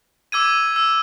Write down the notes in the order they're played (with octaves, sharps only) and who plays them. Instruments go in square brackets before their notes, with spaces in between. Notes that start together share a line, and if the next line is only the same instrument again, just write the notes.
[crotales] D6 E6 G#6 D#7
E6